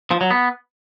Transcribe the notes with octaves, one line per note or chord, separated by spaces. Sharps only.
F3
F#3
B3